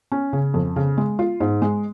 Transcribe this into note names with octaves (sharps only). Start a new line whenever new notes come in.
C#4
C#3
F2
C#3
G#3
F4
G#2
G#3